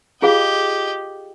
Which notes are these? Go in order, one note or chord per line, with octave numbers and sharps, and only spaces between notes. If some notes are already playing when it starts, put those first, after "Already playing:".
F4 G4 G#4 D#5 F5